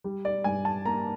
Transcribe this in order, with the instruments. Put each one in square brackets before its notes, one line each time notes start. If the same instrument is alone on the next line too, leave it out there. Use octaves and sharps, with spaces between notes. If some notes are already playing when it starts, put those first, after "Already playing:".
[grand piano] G3
D5
G2 G#5
A5
A#3 A#5